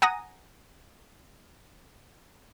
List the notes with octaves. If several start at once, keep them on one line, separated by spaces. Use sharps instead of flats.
F#5 G#5 A#5 D#6 A#6 D#7